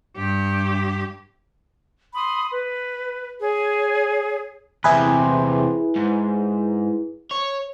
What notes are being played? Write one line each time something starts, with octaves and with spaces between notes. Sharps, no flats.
G2 G4
B5 C6 D#6
B4
G#4 C#5
E2 C3 E4 G#4 B4
G#2
C#5